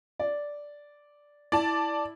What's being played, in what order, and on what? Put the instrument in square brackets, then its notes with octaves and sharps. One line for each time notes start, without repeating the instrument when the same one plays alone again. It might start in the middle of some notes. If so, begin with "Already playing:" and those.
[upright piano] D5
[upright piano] E4 [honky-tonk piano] D5 A5